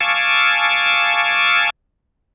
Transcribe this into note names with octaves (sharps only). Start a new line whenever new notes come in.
F5 G#5 A5 C#6 D6 E6